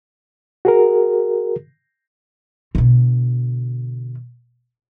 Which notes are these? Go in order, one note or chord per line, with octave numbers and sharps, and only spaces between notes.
F#4 G#4 A#4
B2 D3